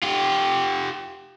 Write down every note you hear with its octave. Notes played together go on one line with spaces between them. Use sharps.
F4 G4